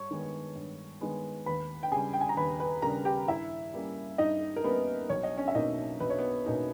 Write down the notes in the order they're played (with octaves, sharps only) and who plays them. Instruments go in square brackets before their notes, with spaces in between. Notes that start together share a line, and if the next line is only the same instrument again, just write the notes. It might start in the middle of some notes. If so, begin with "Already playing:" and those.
Already playing: [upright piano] G2 C#5 C#6
D#3 G#3 B3
G2
D#3 G#3 B3
D#2 B4 B5
G5
C#3 G3 C#4 G#4 G#5
G5
G#5
A#5
D#2 B4 B5
B4 B5
C#3 G3 C#4 A#4 A#5
G4 G5
G2 E4 E5
G3 A#3 C#4
G2 D#4 D#5
A#4
G3 A#3 B3 C#4 B4
B1 C#5
D#5
C#4 C#5
E5
B2 A#3 C#4 D#4 D#5
B1 B4
C#5
B3 B4
B2 A#3 C#4 D#4